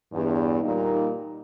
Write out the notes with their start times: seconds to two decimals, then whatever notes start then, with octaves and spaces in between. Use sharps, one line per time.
0.12 E2 G2
0.62 A#2 G3 A#3 D#4